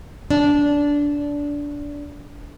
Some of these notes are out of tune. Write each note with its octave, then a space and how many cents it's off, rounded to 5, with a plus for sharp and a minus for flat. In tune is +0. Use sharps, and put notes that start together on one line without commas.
D4 -15